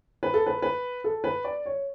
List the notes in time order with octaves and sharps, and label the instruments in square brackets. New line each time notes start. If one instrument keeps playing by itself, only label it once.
[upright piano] B4
A4
B4
B4
A4
B4
D5
C#5